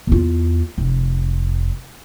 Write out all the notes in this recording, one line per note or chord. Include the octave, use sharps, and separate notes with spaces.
E2 F4
F1